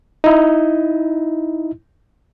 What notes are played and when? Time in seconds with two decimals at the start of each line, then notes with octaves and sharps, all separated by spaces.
0.24 D#4 E4